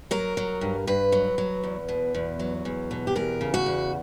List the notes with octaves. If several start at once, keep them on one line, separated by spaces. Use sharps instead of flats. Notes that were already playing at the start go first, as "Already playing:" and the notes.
F#3 A#4
F#3
G2
G2 B4
F#3
F#3
E2
B2
E2
F#3
E2
B2
G4
E2 A#4
C#3
F#4
E2